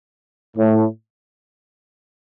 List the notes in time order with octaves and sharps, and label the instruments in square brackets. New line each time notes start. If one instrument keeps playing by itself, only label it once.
[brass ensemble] A2